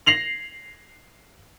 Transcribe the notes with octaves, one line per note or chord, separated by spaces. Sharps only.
A#6 C7 F7 F#7